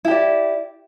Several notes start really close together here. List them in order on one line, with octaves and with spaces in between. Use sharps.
E4 G4 D5